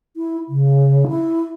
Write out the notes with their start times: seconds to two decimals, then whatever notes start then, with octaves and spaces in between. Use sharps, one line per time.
0.17 E4
0.49 C#3
1.08 E4